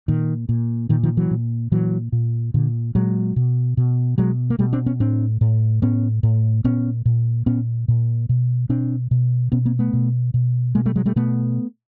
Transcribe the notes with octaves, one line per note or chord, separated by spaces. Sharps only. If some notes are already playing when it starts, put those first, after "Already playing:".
A#2 D#3
A#2
A#2 D#3
D#3 F3
E3 F#3
A#2
A#2 E3 F#3
A#2
A#2 D3
A#2 F#3 G#3
B2
B2
B2 F#3 G#3
A#3
B2 G3 A3
C4 D4
B3 C#4
A2 C4 D4
A2
A2 B3 C#4
A2
A#2 B3 C#4
A#2
A#2 B3 C#4
A#2
B2
B2 C4 D4
B2
B2 B3 C#4
A#3 C4
A3 B3
B2
B2
B2 G#3 A#3
G3 A3
F#3 G#3
G3 A3
B2 A3 B3